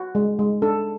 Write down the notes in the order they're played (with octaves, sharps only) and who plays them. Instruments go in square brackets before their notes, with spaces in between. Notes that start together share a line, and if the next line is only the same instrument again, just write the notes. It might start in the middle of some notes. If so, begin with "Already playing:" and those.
Already playing: [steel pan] F#4
G#3
G#3
D4 A4